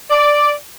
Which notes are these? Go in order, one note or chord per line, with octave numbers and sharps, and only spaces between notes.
D5